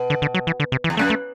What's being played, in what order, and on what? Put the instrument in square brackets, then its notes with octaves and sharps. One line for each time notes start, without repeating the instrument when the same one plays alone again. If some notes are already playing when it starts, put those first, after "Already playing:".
Already playing: [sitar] B2
[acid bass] D3
D3
F#3
E3
D3
C3
E3
[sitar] E2
[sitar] F#2 [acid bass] A3
[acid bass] A3